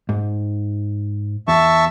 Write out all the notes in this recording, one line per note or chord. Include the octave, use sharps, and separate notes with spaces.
G#2
E2 E5 A5 C#6